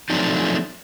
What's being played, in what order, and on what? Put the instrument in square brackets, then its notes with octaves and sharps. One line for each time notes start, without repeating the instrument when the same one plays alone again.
[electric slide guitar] F3 F#3 A3 C4 D4 D#4